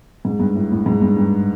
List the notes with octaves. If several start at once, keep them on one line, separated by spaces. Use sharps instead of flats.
G#2
G2
A2
A2
G#2
G2
G2